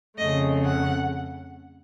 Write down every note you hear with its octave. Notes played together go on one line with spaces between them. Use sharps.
F2 C#3 A3 D#5
F#5